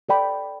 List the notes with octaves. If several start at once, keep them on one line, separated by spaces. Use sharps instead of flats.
A4 D5 G5 B5